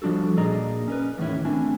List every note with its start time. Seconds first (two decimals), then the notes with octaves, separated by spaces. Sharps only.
0.02 F3 G3 D4 F#4 A4
0.37 A#2 A#3 G#4 D5 D#5 A#5
0.88 C#4 A#4 B4
1.18 E2 A2 D#3 E3 C#4 E4
1.45 A3 C4 D4 E4 G#5